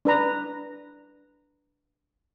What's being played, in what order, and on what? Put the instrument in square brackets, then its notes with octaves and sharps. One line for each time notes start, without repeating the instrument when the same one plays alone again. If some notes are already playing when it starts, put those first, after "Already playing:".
[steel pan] D4 B4 A#5